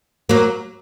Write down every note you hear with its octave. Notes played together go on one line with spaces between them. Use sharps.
F#3 A#3